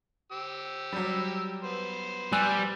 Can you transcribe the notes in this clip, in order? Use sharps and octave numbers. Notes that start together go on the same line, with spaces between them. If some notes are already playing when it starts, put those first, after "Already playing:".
G4 E6
F#3 G3
B3 C5
G3 G#5 E6 F#6